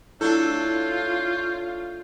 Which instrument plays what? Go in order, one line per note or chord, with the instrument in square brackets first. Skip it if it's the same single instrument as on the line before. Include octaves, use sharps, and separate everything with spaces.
[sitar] A3 D4 A4 [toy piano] E4 [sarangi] F4 [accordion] C#5 G6